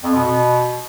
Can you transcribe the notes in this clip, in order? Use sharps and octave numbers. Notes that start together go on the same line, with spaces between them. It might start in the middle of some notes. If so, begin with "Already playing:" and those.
F2
B2
B2